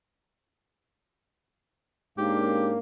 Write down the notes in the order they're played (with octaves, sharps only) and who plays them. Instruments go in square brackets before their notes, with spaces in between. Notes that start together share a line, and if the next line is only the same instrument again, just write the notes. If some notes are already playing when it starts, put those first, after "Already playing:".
[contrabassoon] G#2 [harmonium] A#3 [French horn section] C#4 D4 [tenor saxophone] G4